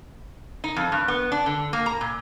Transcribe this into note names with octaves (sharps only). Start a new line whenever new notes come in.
D#4
F2
G2
B3
D4
D3
A#3
A#5
A#2